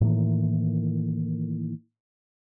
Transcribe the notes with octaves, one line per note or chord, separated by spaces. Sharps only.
A2 D#3 E3 A#3